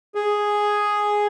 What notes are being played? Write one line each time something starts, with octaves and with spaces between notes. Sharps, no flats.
G#4